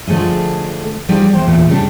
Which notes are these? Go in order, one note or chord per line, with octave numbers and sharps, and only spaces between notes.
D3 F3 A3 G#4 D#5
F3 G3 D#4 G4 G#4 D5
E2 C5 G5
E2 A#2 A3
C#3 G3 D4